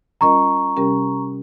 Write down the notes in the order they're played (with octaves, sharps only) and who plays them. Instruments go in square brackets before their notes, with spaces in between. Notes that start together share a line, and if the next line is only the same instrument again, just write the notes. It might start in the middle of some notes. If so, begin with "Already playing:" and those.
[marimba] G3 C#4 F4 A#4 D#5 [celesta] A#5 C#6
[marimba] C3 G3 C#4 G4 A#4